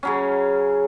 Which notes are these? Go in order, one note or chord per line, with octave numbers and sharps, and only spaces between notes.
C#3 F#3 C#4